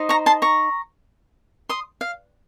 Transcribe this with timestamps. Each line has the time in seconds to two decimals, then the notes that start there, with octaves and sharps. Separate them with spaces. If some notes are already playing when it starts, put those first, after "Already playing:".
Already playing: D#4 C5 D#5
0.09 A#5 C#6
0.26 A5 C6
0.42 A#5 C#6
1.69 C6 D#6
2.01 F5